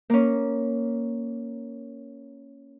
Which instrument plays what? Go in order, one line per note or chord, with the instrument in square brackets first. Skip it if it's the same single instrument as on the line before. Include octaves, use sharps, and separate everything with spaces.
[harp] A#3 C#4